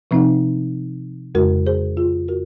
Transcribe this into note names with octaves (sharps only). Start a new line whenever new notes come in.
C3 F3 C4 D#4
F2 C#3 G#3 F#4 A#4
G#4 C5
F4 G#4
F#4 A#4